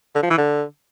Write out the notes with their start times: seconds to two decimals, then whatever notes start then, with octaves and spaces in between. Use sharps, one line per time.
0.15 D3
0.23 F3
0.30 E3
0.38 D3